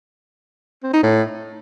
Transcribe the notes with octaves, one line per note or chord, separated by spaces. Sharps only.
C4
D#4
A2